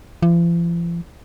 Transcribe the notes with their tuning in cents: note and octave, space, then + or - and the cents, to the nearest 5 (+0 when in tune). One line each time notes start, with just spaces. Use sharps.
F3 -45